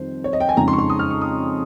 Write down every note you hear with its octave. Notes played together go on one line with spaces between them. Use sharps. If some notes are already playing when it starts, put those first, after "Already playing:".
Already playing: F2 D#3 G3 C5
C#5
D#5
G5
G#5
F2 C#3 G#3 D#4 A#5
C6
C#6
C6
D#6
F6
C#6
D#6